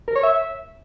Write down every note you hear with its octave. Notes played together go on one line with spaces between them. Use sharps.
A#4
C#5
E5